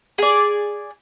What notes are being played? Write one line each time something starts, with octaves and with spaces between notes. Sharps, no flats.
G#4 D5